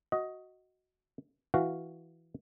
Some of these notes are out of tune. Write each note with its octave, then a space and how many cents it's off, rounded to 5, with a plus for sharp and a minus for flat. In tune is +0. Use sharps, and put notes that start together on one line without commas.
F#4 +0 D#5 +15
E3 +5 F#4 +0 F5 +0